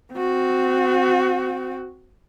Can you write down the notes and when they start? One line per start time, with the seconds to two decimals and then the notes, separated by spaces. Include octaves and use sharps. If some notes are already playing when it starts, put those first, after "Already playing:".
0.13 C4 F#4